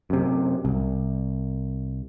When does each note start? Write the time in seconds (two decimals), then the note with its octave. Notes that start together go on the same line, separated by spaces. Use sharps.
0.10 F#2 C3
0.65 C2